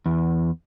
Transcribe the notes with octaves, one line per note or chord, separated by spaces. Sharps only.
E2